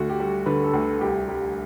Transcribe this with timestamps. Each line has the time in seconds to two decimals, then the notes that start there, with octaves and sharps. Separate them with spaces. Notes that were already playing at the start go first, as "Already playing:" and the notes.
Already playing: D2 F#4
0.10 G4
0.20 G3
0.46 D3 B4
0.64 A4
0.73 D2
1.01 C2 G4
1.29 G3